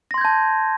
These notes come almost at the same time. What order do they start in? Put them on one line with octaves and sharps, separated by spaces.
A#6 C6 G#6 G6 A5